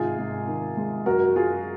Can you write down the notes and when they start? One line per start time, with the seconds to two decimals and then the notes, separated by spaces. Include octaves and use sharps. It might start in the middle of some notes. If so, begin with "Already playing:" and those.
Already playing: G#2 C3 D#3 F4 G#4
0.18 G#2
0.48 D#3
0.77 G#3
1.06 F#2 F#4 A#4
1.36 F#2 F4 G#4